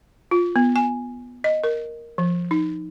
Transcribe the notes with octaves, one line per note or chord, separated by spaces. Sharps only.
F4
B3
G#5
D#5
A#4
F3
D#4